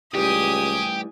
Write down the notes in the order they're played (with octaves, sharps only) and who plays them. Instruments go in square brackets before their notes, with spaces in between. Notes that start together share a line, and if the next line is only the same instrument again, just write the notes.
[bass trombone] C#2 [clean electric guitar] A2 E3 G3 [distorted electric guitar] G4 [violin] G#5 D#6